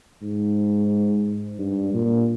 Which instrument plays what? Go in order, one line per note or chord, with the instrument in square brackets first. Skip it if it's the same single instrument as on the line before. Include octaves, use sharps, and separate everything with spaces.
[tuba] G#2
G2
A#2